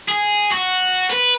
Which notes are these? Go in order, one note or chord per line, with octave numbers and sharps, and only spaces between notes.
G#4
F#4
B4